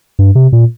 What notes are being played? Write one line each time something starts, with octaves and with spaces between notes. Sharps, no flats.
G2
C3
A#2